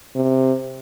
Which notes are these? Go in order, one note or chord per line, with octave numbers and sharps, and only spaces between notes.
C3